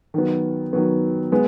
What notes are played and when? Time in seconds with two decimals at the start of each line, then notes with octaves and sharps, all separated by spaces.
0.14 D#3 F#3 B3
0.73 D#3 F#3 B3
1.32 G#3 B3